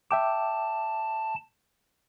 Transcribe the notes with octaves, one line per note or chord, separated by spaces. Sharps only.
E5 G5 A5 D6